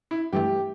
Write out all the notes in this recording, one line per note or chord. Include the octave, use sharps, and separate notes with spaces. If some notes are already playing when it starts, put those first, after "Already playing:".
E4
G2 E3 A3 G4